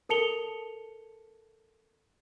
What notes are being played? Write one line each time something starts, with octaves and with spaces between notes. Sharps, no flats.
A4 A#4 A5 C#7 F7 G7